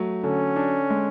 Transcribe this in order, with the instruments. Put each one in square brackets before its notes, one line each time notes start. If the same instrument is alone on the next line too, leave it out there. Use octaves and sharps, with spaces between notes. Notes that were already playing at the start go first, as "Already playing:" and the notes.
Already playing: [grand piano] F#3 A3
[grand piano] D3 [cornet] C#4
[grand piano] D4
G#3